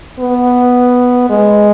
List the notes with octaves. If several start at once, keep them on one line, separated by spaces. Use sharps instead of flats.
B3
G#3